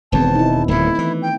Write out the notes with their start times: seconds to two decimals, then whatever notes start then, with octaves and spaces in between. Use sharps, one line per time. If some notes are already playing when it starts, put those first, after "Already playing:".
0.12 E1 E2 D#3 B3 C4 A5
0.35 D#4 E4
0.68 D1 A#2 A3 E4
0.98 E3
1.22 G5